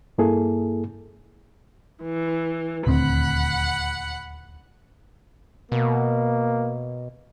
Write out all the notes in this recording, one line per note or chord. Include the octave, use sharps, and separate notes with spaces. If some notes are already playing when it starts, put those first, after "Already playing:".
G2 A#3 E4 G#4 A4
E3
D#1 D2 C4 F#5 B5
B2 A#3